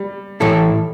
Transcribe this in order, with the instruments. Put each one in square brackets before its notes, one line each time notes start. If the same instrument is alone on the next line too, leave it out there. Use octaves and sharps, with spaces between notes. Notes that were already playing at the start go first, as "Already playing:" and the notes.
Already playing: [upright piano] G3
[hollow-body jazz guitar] A2 E3 A3 E4 A4